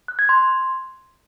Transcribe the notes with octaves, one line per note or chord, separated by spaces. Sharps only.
F#6
G#6
C6